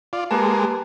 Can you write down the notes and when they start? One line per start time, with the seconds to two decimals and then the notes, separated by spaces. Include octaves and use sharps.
0.13 F4 D5
0.31 G#3 A#3 G4 B4 A5